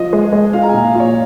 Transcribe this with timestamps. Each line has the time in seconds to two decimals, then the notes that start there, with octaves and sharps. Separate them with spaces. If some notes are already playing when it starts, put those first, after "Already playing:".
Already playing: F3 D#5
0.13 G#3
0.33 G#3
0.53 F4 F5
0.62 A#5
0.69 G#5
0.74 A#2
0.84 F5
0.95 F4 C#5